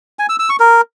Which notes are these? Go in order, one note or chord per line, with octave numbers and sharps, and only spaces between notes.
G#5
E6
E6
C#6
A#4